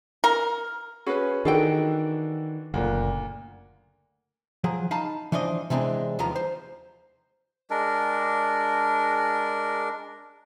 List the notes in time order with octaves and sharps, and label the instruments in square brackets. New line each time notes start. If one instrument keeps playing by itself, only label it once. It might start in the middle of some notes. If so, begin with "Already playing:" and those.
[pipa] A#4
[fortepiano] C#4 F#4 B5 [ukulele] G#4 B4
[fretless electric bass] D#3 [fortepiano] E3 D4 F#4 [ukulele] G#4 A4 G5
[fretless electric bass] F#1 A#2 [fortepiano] D2 A#3 F#6
[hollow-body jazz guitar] F3 F#3 G#4
D#4 F5 A5 B5
E3 F3 D4 C5 D#5
C3 E3 G#3 C4 D4
D#2 D#3 F3 B3 A#5
C5
[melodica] G#3 D4 A#4